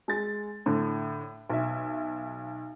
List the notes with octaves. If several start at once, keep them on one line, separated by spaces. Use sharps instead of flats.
G#3 A6
A2 D3
B1 E5